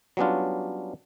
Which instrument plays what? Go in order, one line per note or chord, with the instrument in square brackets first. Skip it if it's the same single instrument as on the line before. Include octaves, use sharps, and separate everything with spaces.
[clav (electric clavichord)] F#3 G3 B3 C#4 D4 F4